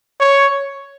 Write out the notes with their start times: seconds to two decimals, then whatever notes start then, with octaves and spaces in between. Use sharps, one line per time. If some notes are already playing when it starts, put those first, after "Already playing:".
0.20 C#5